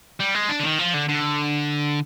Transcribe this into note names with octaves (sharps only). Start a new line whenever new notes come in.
G3
G#3
D4
D3
D#3
F3
D3
D3